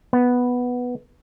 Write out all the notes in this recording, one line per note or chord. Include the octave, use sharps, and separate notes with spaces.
B3